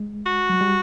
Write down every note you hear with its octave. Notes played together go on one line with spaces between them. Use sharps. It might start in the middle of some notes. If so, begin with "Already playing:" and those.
Already playing: G#3
F#4
F#3
G3